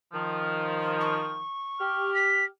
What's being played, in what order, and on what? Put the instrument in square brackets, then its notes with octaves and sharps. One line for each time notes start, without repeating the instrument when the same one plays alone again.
[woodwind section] D#3 F3
[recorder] C#6
[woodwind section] G4 F6
[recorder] B6